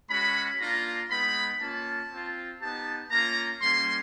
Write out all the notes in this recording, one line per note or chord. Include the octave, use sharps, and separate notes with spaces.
G#3 C#4 F#4 B5
A#3 D4 F4 A#5
G#3 B3 D#4 B5
A#3 C#4 F4 A5
C4 F4
B3 D#4 G4 A5
A#3 C#4 F4 A#5
G3 A#3 C#4 C6